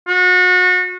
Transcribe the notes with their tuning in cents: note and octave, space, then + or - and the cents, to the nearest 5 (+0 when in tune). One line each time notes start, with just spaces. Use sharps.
F#4 -30